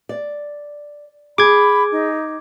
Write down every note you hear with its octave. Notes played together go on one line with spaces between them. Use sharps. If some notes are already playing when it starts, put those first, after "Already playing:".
D5
G#4 B5 D6 G#6
D#4